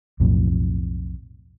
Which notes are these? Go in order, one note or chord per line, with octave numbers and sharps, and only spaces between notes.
B1 F2 A2